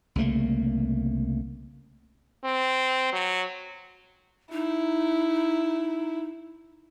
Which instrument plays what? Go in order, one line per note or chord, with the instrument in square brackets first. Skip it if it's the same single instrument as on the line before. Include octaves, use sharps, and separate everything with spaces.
[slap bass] C2 C#3 A3 A#3
[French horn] C4
F#3
[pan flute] D#4 [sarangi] E4